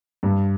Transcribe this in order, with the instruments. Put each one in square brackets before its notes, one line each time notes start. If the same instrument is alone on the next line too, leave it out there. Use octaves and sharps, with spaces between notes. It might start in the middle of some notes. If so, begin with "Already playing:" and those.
[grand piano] G2